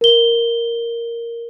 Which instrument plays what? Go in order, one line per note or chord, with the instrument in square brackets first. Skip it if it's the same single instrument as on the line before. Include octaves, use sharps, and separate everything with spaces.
[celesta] A#4 G7